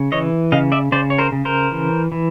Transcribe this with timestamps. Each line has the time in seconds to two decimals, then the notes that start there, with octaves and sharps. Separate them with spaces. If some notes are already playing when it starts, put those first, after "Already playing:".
Already playing: C#3
0.12 E3 C#5 D#5
0.52 C#3 D#5 F5
0.72 D5 E5
0.92 C#3 C5 D5
1.10 C#5
1.18 A#4 C5
1.32 C#3
1.45 A#4 C5
1.71 E3
2.12 E3